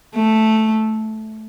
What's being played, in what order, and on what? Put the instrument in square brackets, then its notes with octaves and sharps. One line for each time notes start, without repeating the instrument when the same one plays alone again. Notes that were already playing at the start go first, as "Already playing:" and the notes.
[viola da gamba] A3